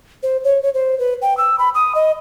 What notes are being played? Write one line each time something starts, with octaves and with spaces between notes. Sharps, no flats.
C5
C#5
C#5
C5
B4
G5
E6
B5
D#6
D#5